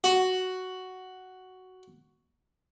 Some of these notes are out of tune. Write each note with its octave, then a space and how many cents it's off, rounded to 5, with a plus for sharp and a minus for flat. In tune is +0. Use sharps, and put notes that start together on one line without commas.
F#4 +5